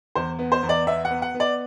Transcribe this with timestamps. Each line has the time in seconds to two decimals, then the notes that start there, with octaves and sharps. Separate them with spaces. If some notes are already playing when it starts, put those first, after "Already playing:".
0.15 E2 C5
0.39 B3
0.52 C5
0.63 E2
0.69 D5
0.87 B3 E5
1.05 F#5
1.10 B3
1.22 F#5
1.34 B3
1.40 D5